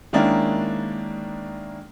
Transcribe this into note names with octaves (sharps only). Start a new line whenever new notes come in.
D#3 G#3 A#3 C#4 D4 E4